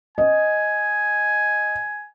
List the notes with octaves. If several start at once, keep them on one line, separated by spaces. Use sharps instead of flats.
D#5 G#5